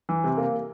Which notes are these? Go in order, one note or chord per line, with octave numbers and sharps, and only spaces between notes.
E3
C3
A#3